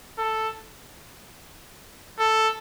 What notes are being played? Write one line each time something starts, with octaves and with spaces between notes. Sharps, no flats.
A4
A4